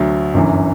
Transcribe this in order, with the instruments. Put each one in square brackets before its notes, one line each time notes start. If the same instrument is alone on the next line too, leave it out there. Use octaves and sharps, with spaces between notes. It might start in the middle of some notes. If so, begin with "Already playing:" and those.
Already playing: [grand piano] D2 D3 F#3
G1 F#2 E3